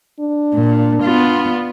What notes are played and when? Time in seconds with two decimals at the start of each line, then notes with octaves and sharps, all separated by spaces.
0.20 D4
0.55 A#2
1.03 B3 F4